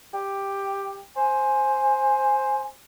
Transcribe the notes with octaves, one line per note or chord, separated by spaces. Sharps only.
G4
C5 G#5